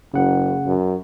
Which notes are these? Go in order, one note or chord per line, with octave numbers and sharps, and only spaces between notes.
F#1 C#3 F#5
F#2